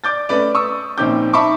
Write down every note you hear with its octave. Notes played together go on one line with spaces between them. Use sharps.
D5 D6 G6 A6
A3 C#4 B4 D5
C#6 D#6 E6
A#1 D#3 C4 C#4 D6 G6
D#4 E5 A5 B5 C#6 D6